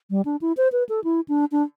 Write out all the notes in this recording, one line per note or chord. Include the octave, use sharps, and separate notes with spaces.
G3
D4
E4
C5
B4
A4
E4
D4
D4